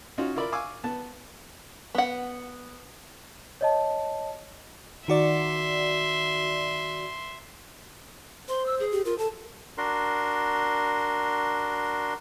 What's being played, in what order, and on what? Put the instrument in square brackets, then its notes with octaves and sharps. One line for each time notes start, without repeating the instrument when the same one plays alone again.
[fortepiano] C#4 D#4 F4 F#4
E4 F4 A#4 D5 E5 B5
F5 G#5 C#6 D6 E6
B3 A5
[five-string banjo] B3 F#5
[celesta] C#5 D#5 A5
[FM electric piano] D#3 F#4 D5 [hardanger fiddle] E5 C6
[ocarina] C5 [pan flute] C6
[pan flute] E6
G#4
[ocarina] G4
[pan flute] F4 [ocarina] A#4
[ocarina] A4 [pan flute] A5
[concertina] D4 F#4 A#4 C6